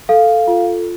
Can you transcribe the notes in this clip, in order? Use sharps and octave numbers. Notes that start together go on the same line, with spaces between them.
A4 F5
F4